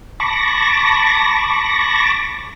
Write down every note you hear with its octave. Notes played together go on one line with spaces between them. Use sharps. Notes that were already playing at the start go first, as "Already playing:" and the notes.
A5 B5 C#6 D6 A#6